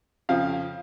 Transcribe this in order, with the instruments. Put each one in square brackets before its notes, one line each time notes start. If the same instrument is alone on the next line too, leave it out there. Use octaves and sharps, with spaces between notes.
[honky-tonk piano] F2 C#3 F3 F5